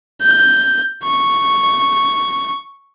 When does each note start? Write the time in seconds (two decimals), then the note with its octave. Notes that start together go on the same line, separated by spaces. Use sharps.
0.22 G6
1.04 C#6